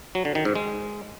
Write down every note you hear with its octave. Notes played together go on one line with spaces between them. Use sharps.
F#3
D3
D#3
G#2
G#3